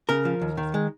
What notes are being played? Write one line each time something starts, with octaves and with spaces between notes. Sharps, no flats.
C#3 A#4
F3
D#2
D#3
G#3